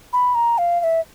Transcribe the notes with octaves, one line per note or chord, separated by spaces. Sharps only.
B5
A#5
F5
F5
E5